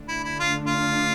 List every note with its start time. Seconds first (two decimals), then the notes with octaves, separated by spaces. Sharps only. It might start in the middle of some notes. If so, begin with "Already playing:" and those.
Already playing: D3 A3 D4
0.08 E4
0.24 E4
0.40 F4
0.67 F4